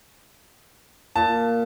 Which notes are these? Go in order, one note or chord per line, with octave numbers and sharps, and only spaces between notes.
A#2 A5